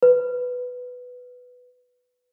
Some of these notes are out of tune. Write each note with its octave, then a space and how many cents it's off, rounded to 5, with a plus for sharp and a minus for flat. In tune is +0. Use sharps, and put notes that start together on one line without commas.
B4 +5